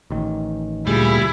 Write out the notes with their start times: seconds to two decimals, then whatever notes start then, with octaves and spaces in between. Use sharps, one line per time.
0.10 A1 D#3
0.87 D2 A#2 G3 E4 G#4